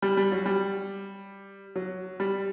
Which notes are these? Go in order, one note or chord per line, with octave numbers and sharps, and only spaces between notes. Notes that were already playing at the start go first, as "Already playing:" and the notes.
G3
G3
F#3
G3
F#3
G3